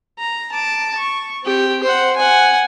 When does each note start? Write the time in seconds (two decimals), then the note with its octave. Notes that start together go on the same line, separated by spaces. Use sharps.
0.19 A#5
0.52 A5 D6
0.97 C#6
1.43 C4 G4
1.83 C5 F#5
2.16 F#5 G#5